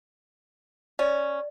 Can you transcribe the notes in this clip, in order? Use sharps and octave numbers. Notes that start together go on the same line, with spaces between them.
C#4 D5